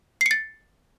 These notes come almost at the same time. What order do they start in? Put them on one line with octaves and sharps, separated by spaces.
C7 C#7 A6